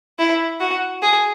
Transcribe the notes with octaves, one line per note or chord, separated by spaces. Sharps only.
E4
F#4
G#4